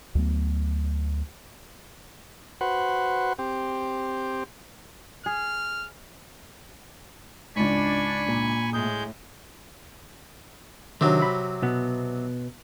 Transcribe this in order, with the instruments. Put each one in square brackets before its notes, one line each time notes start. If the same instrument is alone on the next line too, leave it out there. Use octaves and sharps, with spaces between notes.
[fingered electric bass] D2 F#3 A3 B3
[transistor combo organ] F#4 B4 C5 F#5
C4 G4
[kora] G#4 [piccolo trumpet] F6
[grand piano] C#2 G#2 [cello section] D4 D5 [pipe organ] G#5 B5 C#6
[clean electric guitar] A#2
[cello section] A2 [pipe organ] G#3 G6 [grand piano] D#6
[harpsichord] C3 F#3 [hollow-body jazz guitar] D#3 D4
[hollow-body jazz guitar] B5
B2 B3